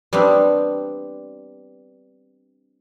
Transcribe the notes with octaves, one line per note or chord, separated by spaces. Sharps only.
G3 B3 C4 D4